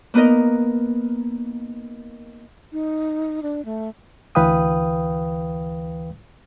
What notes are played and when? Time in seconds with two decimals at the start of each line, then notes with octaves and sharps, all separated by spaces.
0.14 A#3 B3 D#4 A#4 D#5
2.72 D#4
3.42 D4
3.65 A3
4.35 D2 E3 B4 F5 G5 D#6